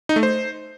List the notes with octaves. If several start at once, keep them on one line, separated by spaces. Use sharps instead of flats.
D#4
A3
C5